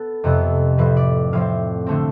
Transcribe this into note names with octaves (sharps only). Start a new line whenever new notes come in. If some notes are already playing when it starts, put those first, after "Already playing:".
Already playing: B3 A4
F2 C3 F3 B3
A2 F3 C4 B4
D5
A2 F3 C4 F5
D3 A3 C4